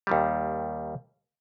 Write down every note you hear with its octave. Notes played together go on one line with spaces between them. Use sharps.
D#2 D#3 G3